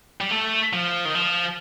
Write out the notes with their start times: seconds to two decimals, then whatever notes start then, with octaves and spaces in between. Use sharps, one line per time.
0.21 G3
0.31 A3
0.73 F3
1.05 D#3
1.15 F3